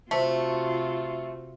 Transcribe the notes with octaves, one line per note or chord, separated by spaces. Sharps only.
C3 A3 F4 F#4 C5 B6